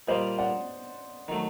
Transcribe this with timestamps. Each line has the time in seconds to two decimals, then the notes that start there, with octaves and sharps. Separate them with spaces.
0.08 A#2 G3 A#3 C5 D#5
0.38 D5 F#5
1.28 D#3 F#3 A3